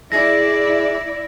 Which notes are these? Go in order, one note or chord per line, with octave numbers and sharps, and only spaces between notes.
G#3 E4 G#4 D5 A#6